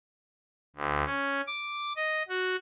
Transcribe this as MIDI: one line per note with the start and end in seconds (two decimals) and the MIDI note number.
0.76 1.04 38
1.06 1.41 61
1.47 1.93 86
1.96 2.23 75
2.29 2.56 66